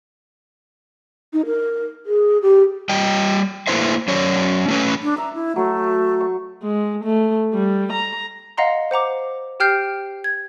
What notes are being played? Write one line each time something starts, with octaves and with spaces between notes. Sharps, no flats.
D#4
A#4
G#4
G4
G3 D#5 G5
A3 A#3 E4 B4 C5 E5
F#3 C#4 C#5 D5
A3 C#4 B4
D4
E5 A#5
E4
F#3 A3
C#6
G#3
A3
G3
A#5
D#5 F5 F#5 A#5 C6
C5 F#5 A#5 D6
G4 G5 F6 G6 C7 D7
G#6